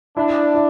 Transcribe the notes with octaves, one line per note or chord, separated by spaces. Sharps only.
D4 E4
E4